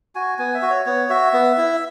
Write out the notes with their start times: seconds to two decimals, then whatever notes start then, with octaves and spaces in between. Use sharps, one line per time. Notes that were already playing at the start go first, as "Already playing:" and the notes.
0.15 F#4 G#5
0.38 B3 G#5
0.55 E5
0.62 F#4
0.70 C#5
0.86 B3 C#5
1.10 F#4 E5
1.33 B3
1.57 E4